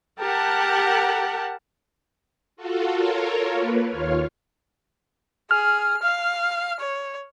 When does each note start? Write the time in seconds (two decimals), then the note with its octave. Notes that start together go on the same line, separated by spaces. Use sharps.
0.21 G4 A#4 F#5 A5
2.56 F4 F#4 A4
2.97 F4 A4 A#4 C#5
3.53 A#3 B4
3.88 D#2 F4 C#5 F5
5.51 G#4 F6
6.02 F5
6.80 C#5